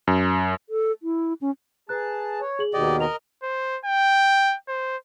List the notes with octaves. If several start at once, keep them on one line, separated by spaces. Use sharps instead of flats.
F#2
A4
E4
C#4
G#4 B4 A5 A#5 F#6
C#5
G#4 F#7
D#2 B2 D#3 G4 D5 D#5
A#4 D#5 F7
C5
G5
C5